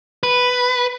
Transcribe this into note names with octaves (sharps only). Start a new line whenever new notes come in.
B4